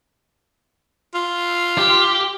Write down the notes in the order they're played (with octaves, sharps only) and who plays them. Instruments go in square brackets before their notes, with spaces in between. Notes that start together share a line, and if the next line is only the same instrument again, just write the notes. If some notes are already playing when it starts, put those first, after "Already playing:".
[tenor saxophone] F4
[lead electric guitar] G4